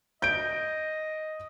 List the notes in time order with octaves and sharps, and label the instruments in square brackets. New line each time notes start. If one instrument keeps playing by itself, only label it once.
[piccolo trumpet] D#5 [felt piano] G6 D7